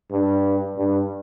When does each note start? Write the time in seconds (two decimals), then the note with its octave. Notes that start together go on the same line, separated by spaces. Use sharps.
0.11 G2
0.76 G2